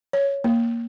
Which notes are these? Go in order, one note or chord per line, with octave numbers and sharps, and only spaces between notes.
C#5
A#3